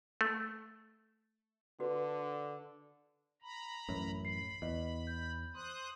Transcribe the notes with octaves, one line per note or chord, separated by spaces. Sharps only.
A3
D3 F#4 B4
A#5 B5
A1 F#2
B5 C7
E2 D#5
G6
C5 C6 D#6 F#6